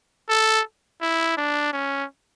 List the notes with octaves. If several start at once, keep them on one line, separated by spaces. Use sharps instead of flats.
A4
E4
D4
C#4